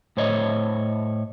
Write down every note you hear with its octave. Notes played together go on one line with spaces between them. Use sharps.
A2 C5 C#5 D#5